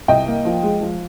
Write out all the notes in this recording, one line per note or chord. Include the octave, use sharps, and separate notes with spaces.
C2 D#5 G5
A#3
F3
G#3
F3